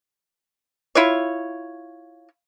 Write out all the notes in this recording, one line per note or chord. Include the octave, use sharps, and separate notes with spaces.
E4 F4 C#5